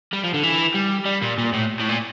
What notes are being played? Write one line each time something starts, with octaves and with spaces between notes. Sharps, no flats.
G3
F3
D3
E3
G3
G3
A#2
A#2
A2
A2
A#2